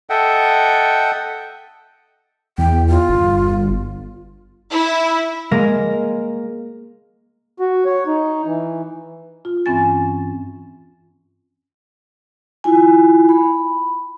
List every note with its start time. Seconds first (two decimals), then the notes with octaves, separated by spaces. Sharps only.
0.10 A4 D#5 E5 F#5 G5
2.58 E2 G5
2.89 F4
3.09 G1
4.72 E4
5.51 G#3 A#3 A#4
7.59 F#4
7.85 C#5
8.07 D#4
8.46 E3
9.45 F4
9.66 G2 E3 C4 C#4 G#5 A6
12.64 E4 F4 G#5
13.29 B5